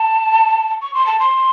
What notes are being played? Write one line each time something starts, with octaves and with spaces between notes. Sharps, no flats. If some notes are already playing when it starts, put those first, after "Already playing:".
Already playing: A5
C#6
C6
A5
C6